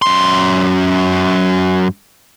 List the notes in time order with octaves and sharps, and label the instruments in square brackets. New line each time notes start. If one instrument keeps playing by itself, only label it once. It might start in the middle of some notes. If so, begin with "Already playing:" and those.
[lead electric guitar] F#2 C6